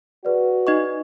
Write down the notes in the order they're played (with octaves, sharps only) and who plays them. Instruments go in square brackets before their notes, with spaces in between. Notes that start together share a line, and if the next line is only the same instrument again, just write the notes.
[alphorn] F#4 [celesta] G#4 B4 D5
[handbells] D#4 D#5 C#6